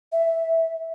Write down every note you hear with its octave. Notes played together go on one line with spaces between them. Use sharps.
E5